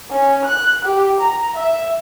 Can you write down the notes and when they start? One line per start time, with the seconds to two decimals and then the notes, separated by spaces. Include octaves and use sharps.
0.11 C#4
0.45 F#6
0.84 G4
1.20 A#5
1.56 E5